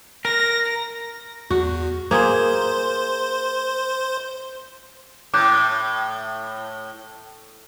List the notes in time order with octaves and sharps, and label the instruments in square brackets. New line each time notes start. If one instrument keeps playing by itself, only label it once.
[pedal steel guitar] A#4 [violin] A#6
[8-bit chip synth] E2 [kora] F#4
[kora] A#3 G#4 [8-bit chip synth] C5 C6
[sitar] A2 [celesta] D6 F#6 G6